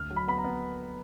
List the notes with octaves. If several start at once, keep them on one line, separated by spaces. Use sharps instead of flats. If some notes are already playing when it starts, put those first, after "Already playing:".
Already playing: D2 F6
F#3
B5
B3 B5
A#5
B3